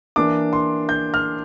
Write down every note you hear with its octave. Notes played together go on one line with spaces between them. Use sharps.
E3 A#3 D4 D6
C6
G6
F6